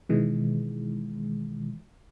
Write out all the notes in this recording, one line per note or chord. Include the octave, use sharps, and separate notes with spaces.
B2 D#3 E3 G#3